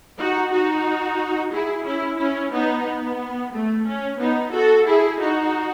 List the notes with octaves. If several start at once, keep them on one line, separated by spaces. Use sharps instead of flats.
D#4 F#4
D#4 F#4
E4 G#4
C#4 E4
C#4 E4
B3 D#4
B3
A3
C#4
B3 D#4
F#4 A4
E4 G#4
D#4 F#4